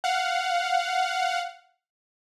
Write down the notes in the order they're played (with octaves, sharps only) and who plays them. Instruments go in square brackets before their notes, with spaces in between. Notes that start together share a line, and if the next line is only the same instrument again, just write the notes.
[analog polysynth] F5 F#5